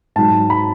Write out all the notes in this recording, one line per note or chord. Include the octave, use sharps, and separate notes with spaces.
G#2 F#3 A5
B5